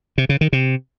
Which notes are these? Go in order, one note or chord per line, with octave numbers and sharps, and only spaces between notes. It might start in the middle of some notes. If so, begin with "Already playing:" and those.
C3
C#3
D#3
C3